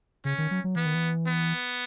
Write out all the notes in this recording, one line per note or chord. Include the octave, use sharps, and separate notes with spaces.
C#3 C#4
D#3
F#3
F#3
E3 B3
D#3
E3
B3